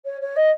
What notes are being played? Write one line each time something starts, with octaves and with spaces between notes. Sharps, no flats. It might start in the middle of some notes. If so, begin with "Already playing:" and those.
C#5
C#5
D#5